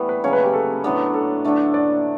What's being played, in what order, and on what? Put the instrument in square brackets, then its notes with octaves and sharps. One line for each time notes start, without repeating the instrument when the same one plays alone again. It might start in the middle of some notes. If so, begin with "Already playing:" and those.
Already playing: [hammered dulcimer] E3 G3 A3 B3
[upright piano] B4
[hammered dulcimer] C#3 F#3 C#4 [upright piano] C#5
[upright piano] B4
G4
A4
[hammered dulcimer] A2 F#3 B3 D4
[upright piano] A4
[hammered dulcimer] D3 A3 D4
[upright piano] D5